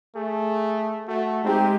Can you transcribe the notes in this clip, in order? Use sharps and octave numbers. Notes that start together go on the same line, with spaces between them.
A3 G#4
A3 F#4
G#3 C4 D#4 G4